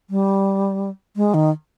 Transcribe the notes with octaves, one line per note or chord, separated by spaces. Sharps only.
G3
G#3
D#3